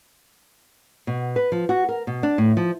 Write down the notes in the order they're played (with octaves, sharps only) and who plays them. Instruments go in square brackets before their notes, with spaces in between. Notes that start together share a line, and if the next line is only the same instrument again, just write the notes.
[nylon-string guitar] B2
B4
F3
F#4
A#4
B2
D4
A2
F3